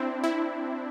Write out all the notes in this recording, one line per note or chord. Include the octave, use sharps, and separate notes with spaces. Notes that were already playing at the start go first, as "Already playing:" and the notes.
Already playing: C4 D4 E4
E4